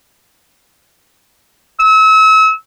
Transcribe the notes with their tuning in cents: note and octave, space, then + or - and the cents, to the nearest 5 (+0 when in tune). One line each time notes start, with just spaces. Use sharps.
E6 -35